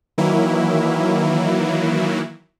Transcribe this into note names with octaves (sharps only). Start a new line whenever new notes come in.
D#3 E3 F#3 A#3 E4